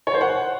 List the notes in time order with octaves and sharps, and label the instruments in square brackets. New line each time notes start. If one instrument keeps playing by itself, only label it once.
[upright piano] C#5
C5
F#5